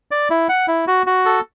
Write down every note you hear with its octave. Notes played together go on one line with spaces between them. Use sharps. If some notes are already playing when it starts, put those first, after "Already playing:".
D5
E4
F#5
E4
F#4
F#4
A4